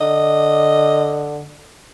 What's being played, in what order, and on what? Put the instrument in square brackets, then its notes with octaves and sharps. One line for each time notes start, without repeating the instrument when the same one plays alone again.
[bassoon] D3 [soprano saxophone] D#5